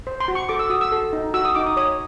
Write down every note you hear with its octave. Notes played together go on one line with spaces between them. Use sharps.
C5
C6
F#4
C#6
A4 D6
E6
F#4 D#6
E6
A4
D#4
F#4 E6
D#6
D#4 D6
D#6
C#5 D#6